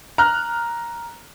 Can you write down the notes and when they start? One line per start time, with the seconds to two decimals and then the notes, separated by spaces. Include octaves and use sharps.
0.18 A#5 F6 F#6